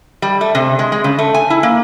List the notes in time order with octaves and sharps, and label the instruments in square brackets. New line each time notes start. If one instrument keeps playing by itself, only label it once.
[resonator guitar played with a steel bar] G3
A3
C3
G#3
G#3
C#3
A3
G#5
E4
A#3